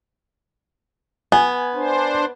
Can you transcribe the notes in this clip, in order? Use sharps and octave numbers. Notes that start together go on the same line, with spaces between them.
B3 G#5
D4 C5